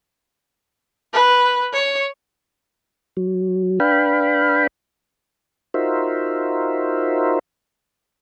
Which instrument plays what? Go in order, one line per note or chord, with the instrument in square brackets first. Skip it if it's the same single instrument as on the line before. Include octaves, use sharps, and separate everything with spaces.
[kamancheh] B4
C#5
[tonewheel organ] F#3
D4 B4 F5 G5 B5
D#4 F4 F#4 A#4 C5 E5